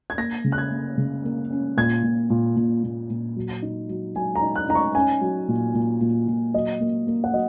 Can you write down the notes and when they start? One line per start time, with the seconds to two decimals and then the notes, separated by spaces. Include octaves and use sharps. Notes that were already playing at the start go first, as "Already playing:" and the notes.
0.10 G#6
0.18 A#3 A#6
0.44 C#3
0.52 F#6
0.58 G#6
0.71 A#3
0.98 C#3
1.24 A#3
1.51 C#4
1.77 A#2 G#6
2.03 A#2
2.30 A#2
2.56 A#2
2.83 A#2
3.10 A#2
3.36 F#3
3.62 D#4
3.89 F#3
4.16 F#3 G#5
4.36 A#5
4.42 D#4
4.55 F#6
4.69 D#4 A#5
4.75 C#6
4.95 C#4 G#5
5.21 F#3
5.48 A#2
5.74 A#2
6.01 A#2
6.28 A#2
6.54 F#3 D#5
6.80 A#3
7.07 A#3
7.24 F#5
7.33 F#3 D#5